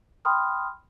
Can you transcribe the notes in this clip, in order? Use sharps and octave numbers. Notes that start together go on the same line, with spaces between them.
G5 B5 C6 D#6 F6